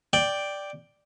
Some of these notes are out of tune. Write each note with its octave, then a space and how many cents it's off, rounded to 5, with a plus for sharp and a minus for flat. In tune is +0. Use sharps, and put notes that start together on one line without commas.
D5 +0 G5 +0